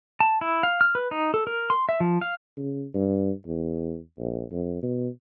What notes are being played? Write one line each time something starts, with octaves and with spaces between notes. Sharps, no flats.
A5
E4
F5
F6
B4
D#4
A4
A#4
C6
E5
F3
F5
C#3
G2
E2
A#1
F2
B2